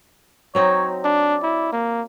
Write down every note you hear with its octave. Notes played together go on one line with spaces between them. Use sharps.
F#3 C4 D#4 C#5
D4 D5
E4
A#3